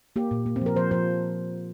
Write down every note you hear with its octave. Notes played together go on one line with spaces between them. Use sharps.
A#3 G4
A#2
A#3
C4
F3 A#4
F3 C5
F3 C5